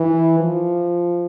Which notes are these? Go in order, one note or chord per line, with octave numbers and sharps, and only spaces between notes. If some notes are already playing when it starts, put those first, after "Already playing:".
Already playing: E3
F3